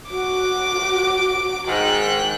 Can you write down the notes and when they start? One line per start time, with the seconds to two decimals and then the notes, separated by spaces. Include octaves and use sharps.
0.10 F#4 D6 D7
1.68 G#2 D#3 G5 F#6